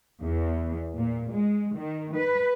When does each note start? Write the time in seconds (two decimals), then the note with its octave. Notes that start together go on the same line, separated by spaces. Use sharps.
0.22 E2
0.98 A#2
1.33 G#3
1.78 D#3
2.16 B4